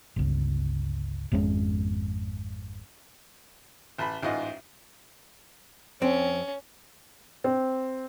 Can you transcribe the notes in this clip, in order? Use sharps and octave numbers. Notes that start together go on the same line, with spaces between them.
G1 C#2
G#1 F2 G#3 C#4
A1 A5 B5
A1 G#2 F4 D#5 F#5
F2 C4 C#4
C4